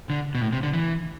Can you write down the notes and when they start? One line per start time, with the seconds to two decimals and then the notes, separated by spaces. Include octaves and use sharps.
0.10 D3
0.35 B2
0.41 A2
0.53 C3
0.63 D3
0.73 E3